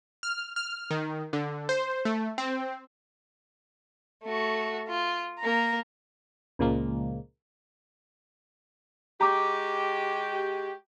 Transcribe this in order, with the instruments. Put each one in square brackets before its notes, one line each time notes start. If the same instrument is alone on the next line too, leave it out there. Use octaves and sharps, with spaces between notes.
[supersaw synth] F6
F6
D#3
D3
C5
A3
C4
[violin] A3 F#4
F4
A#3 A#5
[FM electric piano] C#2 A#2 F3 G#3 A#3
[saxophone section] G#3 F#4 G4 [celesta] A#5 D6